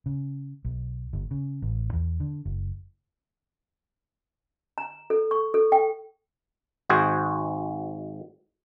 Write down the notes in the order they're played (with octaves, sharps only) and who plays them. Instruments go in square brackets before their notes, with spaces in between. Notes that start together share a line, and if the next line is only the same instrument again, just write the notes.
[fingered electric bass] C#3
B1
G1
C#3
A1
E2
D3
F#1
[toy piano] A#5
A4
C#6
A4
G5
[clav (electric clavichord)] G#1 G#2 F#4 G#4 C5